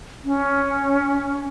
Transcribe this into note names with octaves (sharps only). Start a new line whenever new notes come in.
C#4